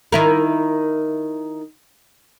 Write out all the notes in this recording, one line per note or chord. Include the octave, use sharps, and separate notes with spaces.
D#3 E4 A#4